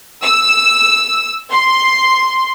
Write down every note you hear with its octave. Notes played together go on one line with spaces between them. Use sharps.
E6
C6